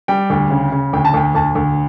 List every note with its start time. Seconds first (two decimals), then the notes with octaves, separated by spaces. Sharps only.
0.08 G3 G5
0.30 D2
0.50 C#3
0.72 C#3
0.93 D2 G5
1.05 A5
1.14 D2 G5
1.35 D2 A5
1.55 D2